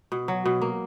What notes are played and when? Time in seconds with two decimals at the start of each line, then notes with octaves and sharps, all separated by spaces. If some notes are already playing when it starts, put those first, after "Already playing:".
0.12 B2
0.28 F#3
0.46 B2
0.62 A#3